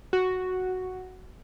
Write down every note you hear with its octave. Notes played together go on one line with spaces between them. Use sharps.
F#4